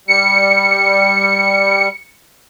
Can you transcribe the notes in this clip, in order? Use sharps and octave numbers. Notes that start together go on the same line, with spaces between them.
G3 C#7